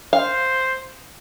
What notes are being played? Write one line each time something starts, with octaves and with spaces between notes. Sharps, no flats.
C5 F5